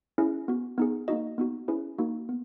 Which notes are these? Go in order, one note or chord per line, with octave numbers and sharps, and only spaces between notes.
C#4 E4 G#4
B3 F#4
B3 D#4 G#4
A#3 D#4 F#4 D#5
B3 D#4 F#4
C#4 E4 G#4 B4
A#3 D#4 F#4
B3